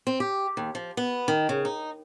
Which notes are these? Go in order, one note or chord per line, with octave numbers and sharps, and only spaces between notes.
C4
G4
D#2
F3
B3
D#3
C#3
D#4